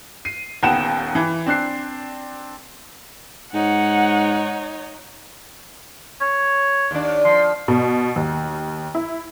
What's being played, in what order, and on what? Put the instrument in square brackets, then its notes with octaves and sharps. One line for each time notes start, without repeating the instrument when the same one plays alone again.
[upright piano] C7 D#7
D#1 D#2 B3 F#5 G5 E7
E3
C4 D4 F#6 C7
[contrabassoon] G#2 [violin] D#4 C#5 [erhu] F#5
[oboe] C#5
[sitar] D#2 D4
[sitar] F3 [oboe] C6
[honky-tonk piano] B2
D#2
E4